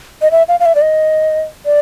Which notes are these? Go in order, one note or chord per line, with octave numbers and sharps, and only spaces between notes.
D#5
E5
F5
F5
E5
D5
D#5
D5